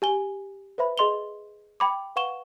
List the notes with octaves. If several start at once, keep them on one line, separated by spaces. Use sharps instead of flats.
G4 G#5 G7
B4 C5 E5 B5
G#4 D#5 C6 F7 G7
G5 B5 D6
B4 F5 F#5 C#6 E7 G7